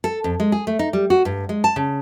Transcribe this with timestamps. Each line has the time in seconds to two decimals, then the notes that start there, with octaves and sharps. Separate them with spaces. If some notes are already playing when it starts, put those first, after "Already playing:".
0.04 A4
0.24 F2
0.40 G#3
0.52 G#4
0.67 A3
0.79 D#4
0.93 G3
1.10 F#4
1.25 G2
1.49 G#3
1.64 A5
1.76 C#3